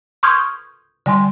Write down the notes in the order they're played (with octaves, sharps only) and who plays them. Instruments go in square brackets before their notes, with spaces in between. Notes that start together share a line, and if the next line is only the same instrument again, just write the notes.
[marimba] C6 C#6 D#6 F6 G6 G#6
D3 G3 G#5 C6